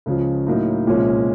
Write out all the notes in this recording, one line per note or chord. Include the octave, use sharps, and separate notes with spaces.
C#2 C#3 F3
A2 F#3 A#3 D#4
C2 A#2 F3 G#3 C#4